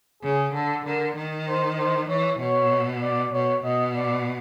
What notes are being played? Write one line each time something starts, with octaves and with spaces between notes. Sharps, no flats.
C#3 G#4
D3 A4
D3 A#4
D#3
C5
C5
E3 C#5
B2 C#5
D5
B2 C#5
B2 D#5
D5